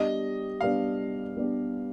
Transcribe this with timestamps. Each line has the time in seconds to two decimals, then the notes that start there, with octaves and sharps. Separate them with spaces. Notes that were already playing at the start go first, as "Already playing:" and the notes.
Already playing: G3 B3 D4 G4 D#5
0.61 G3 B3 D4 G4 F5
1.37 G3 B3 D4 G4